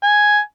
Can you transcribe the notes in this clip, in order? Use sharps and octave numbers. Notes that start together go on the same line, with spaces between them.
G#5